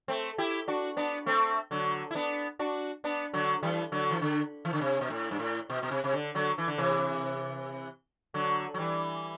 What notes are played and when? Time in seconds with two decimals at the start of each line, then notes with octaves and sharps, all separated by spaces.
0.08 A3 C4
0.38 E4 G4
0.68 D4 F#4
0.97 B3 D4
1.26 A3 C4
1.71 D3 F#3
2.11 E4
2.15 B3 D4
2.59 D4 F#4
3.04 B3 D4
3.34 D3 F#3
3.63 E3 G3
3.92 D3 F#3
4.11 E3
4.22 D3
4.65 E3
4.73 D3
4.81 C3
5.01 B2
5.10 A2
5.31 G2
5.39 A2
5.70 B2
5.83 B2
5.91 C3
6.04 C3
6.14 D3
6.35 D3 F#3
6.58 E3
6.68 D3
6.78 C3 E3
8.34 D3 F#3
8.74 F#3
8.78 E3 G3